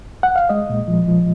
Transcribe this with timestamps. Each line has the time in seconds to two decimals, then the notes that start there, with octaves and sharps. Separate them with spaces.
0.23 F#5
0.36 F5
0.49 G#3 D#5
0.69 A#2
0.88 F3
1.08 F3